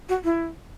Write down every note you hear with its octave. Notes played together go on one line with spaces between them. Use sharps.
F#4
E4